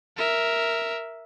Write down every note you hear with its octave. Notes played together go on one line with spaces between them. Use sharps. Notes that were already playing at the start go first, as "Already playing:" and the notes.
A#4 E5